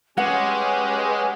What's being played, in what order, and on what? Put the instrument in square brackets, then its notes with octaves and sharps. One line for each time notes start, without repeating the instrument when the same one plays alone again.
[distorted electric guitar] G#3 [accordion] C#4 G4 [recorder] B4 [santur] F#5